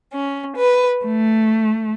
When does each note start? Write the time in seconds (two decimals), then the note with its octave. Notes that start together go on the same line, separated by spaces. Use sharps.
0.13 C#4
0.57 B4
1.05 A3